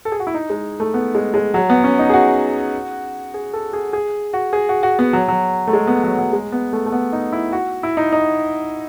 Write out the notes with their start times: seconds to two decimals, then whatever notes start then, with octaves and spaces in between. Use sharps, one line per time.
0.05 A4
0.12 G#4
0.20 F#4
0.27 E4
0.34 D#4
0.50 G#3
0.80 A3
0.94 B3
1.15 G#3
1.34 G#3
1.54 F#3
1.70 B3
1.84 C#4
1.99 D#4
2.10 G#4
2.14 F#4
3.34 G#4
3.53 A4
3.73 G#4
3.93 G#4
4.33 F#4
4.53 G#4
4.69 F#4
4.83 F#4
4.99 B3
5.13 F#3
5.28 F#3
5.67 A3
5.73 G#3
5.87 B3
6.04 F#3
6.19 F#3
6.33 G#3
6.52 B3
6.73 A3
6.86 A3
6.92 B3
7.13 D#4
7.33 E4
7.52 F#4
7.83 E4
7.97 D#4
8.12 D#4